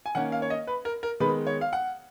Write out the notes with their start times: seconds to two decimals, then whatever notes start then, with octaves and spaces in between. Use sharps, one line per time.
0.06 G#5
0.15 D#3 A#3 C#4 F#5
0.32 F5
0.42 C#5
0.50 D#5
0.67 B4
0.85 A#4
1.03 A#4
1.20 D#3 G#3 B3 B4
1.47 C#5
1.61 F5
1.73 F#5